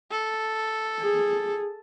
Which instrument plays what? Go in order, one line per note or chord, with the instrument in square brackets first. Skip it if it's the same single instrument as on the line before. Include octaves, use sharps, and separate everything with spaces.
[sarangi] A4
[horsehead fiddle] G#4